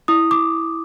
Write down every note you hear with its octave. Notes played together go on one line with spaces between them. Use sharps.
E4 D#6
D6